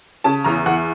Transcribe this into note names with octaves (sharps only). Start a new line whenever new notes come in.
C#3 A5
E2 A#5
E2 F#5